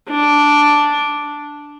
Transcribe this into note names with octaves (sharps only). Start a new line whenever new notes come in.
D4